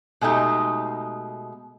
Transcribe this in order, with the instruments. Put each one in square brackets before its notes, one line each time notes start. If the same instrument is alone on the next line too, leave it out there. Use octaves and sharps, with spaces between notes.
[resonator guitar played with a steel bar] B2 G#3 A3 D#4 G4